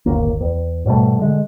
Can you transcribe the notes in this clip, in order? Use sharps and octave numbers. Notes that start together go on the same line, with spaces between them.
D1 G1 D#2 A#3
E2
G#2 B2 G3 A3
D3 G#3